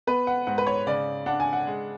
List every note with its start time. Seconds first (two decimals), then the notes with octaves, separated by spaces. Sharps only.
0.07 B3 B4
0.27 F#5
0.47 G#2 F#5
0.58 B4
0.67 C#5
0.87 C#3 D5
1.26 D4 F#5
1.40 G#5
1.53 F#5
1.67 G#3